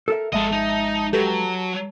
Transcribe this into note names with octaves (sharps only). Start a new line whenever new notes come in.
A4 A#4 E5
G#1 F3 G#3 A4 D#5 E5 A5
D#4
F#3 G4 A4 B4
A5